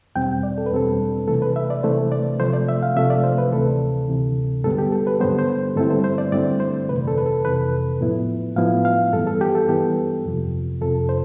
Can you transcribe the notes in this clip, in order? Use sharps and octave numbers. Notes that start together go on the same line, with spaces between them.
E2 B2 G3 C4 G5
D5
A4
B4
E2 B2 G3 C4 A4
C3 E3 A3 A4
B4
E5
D5
C3 E3 A3 C5
D5
C3 F3 A3 C5
D5
E5
F5
C3 F3 A3 E5
D5
C5
B4
D2 C3 E3 A4
D2 C3 E3
G2 D3 G3 B3 A4
G4
A4
B4
G2 D3 G3 B3 C5
C5
G2 D3 A3 C4 E4 A4
C5
C5
D5
G2 D3 A3 C4 E4 D5
C5
F2 C3 E3 B4
A4
B4
A4
F2 C3 E3 B4
A2 F3 B3 E4
A2 F3 B3 E4 F5
F5
G2 E3 B3 A4
A4
G4
A4
G2 E3 B3 G4
F2 C3 F3
F2 C3 F3 A4
C5